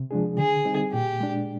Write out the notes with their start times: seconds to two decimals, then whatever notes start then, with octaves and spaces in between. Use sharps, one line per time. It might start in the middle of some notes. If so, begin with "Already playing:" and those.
Already playing: C3
0.11 F3 G#3 D4 G#4
0.38 D3 G#4
0.65 G3 C4 D#4
0.93 A#2 G4
1.20 G#3 D4